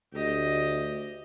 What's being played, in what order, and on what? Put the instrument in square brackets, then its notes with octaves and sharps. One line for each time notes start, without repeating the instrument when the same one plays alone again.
[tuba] D2 [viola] G4 D#5